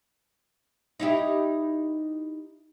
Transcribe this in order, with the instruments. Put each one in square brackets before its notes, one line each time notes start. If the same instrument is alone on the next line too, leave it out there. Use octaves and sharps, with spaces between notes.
[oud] D#4 E4 G4